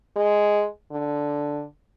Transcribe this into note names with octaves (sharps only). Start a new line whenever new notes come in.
G#3
D3